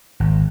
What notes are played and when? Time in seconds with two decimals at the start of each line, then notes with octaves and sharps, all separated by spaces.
0.20 G#1